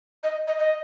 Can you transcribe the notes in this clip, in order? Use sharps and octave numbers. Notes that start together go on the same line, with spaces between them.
D#5
D#5
D#5